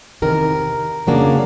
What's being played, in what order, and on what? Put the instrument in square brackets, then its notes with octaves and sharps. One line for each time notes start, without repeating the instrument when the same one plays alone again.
[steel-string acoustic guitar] E2 C3 D#3 A#4
F2 C#3 F#3 A#3 D4